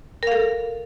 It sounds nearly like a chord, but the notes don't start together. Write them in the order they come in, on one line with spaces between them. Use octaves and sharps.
A#4 F5 A4